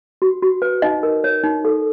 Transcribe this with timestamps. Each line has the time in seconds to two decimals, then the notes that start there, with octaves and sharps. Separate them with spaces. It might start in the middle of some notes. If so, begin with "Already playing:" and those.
0.22 F#4
0.42 F#4
0.62 B4
0.82 D#4 D#5
1.03 A#4
1.24 C#5
1.44 D#4
1.65 A4